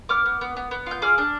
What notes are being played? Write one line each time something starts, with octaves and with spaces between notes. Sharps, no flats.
B3 D6 F6
B3
B3
B3
B3
F4 G6
G#4 D6 F6
D4